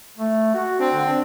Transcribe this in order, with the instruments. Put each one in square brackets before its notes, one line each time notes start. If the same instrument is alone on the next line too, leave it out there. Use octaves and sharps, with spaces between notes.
[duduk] A3
F#4
[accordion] C4 [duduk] D4
[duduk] D3
D4